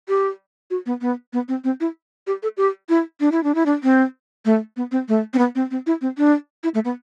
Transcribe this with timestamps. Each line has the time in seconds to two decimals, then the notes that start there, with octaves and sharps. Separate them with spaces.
0.08 G4
0.71 F#4
0.86 B3
1.01 B3
1.33 B3
1.48 C4
1.64 C4
1.80 E4
2.27 G4
2.43 A4
2.57 G4
2.89 E4
3.20 D4
3.32 E4
3.44 D4
3.55 E4
3.66 D4
3.83 C4
4.45 A3
4.77 B3
4.92 C4
5.08 A3
5.34 C4
5.38 B3
5.55 C4
5.71 C4
5.87 E4
6.01 C4
6.18 D4
6.63 E4
6.74 A3
6.85 B3